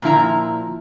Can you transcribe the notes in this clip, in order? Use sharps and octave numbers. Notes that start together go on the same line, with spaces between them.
A#2 F3 E4 A#5